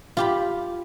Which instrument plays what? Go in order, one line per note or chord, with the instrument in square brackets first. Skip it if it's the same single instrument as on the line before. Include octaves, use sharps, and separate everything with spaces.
[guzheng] F4 G4 B5